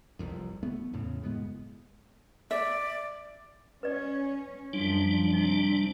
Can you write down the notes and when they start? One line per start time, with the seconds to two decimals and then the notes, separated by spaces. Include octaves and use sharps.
0.19 F1 C2 F2
0.63 A3 B3
0.93 E2 A2 C#3
1.23 F#1 A2 G#3 B3
2.51 D5 E5
3.83 C#4 B4 D5
4.73 F#2 F3 G3 D4
5.33 C3 C4 D#4